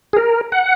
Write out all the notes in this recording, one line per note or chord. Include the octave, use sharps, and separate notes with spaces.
G#4
A#4
F#5